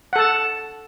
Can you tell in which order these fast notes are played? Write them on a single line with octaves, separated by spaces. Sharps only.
F#5 A4 A5